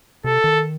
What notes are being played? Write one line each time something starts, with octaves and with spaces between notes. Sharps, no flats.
C3 A4
D#3